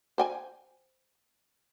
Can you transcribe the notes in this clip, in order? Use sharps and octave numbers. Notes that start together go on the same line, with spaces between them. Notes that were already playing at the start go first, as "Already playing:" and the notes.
C5 G5 G#5